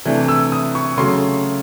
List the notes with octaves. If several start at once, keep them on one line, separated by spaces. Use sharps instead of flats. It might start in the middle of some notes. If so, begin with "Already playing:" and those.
C3 E3 A3 D4
E6
D#6
C#6
C#3 F#3 A3 C6